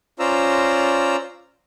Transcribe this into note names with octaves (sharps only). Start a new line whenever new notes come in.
C#4 F4 C5 D5 A#5 E6